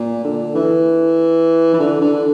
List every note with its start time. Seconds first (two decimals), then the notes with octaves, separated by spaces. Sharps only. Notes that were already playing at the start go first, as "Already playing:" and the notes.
Already playing: A#2
0.24 D3
0.55 E3
1.73 E3
1.80 D3
2.01 D3